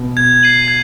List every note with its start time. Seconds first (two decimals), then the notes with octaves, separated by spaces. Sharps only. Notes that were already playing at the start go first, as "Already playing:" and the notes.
Already playing: B2 B3
0.17 G#6
0.43 C7 D#7 F#7
0.68 G#6